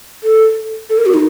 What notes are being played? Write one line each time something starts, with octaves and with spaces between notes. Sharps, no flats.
A4
A4
A#4
F#4
D#4